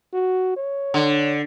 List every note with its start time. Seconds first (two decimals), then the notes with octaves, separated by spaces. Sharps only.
0.14 F#4
0.57 C#5
0.94 D3